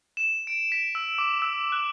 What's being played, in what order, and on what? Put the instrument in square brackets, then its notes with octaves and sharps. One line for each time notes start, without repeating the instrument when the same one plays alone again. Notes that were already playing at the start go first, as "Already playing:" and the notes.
[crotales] E7
D7
B6
E6
D6
E6
F#6